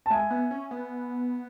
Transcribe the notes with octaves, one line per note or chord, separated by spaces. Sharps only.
A5
G#3 E5 G#5
B3
C#4
B3